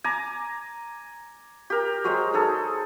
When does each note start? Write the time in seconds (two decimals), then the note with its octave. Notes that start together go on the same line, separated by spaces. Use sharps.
0.04 G#5 A#5 D6
1.70 G4 A#4
2.04 F#3 G#3 C5
2.34 D#4 G#4 A4